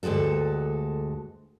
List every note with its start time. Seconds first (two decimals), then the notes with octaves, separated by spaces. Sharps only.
0.03 D2 G2 G#3 F#4 A4